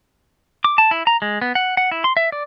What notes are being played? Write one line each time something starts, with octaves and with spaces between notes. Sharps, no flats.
D6
A5
E4
A#5
G#3
B3
F#5
F#5
E4
C6
E5
D5